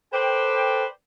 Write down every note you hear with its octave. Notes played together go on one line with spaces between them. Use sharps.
A4 B4 C5 D5 G5